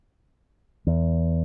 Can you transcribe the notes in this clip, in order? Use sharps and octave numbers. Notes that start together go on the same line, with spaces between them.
E2